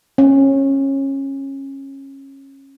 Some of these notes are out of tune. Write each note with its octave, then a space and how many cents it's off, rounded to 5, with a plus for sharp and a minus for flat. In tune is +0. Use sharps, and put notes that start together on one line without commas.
C#4 -20